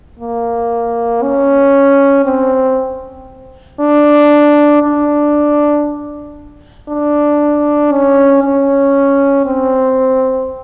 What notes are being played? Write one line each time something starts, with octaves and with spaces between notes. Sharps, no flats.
A#3
C#4
C4
D4
D4
D4
C#4
C#4
C4